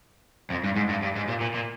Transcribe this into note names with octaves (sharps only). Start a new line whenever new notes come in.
F2
G2
G#2
G2
G2
G#2
A#2
A#2
A#2